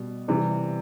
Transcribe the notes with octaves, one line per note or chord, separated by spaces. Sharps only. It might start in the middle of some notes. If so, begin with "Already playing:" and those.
Already playing: B2 G3
C3 E3 G3